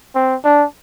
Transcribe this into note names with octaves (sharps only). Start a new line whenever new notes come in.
C4
D4